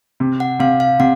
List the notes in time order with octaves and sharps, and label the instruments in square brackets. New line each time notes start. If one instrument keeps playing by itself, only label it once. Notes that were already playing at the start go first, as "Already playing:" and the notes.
[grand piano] C3
[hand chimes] F#5
[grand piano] C3 [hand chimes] F5
[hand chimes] F5
[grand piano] C3 [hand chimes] F#5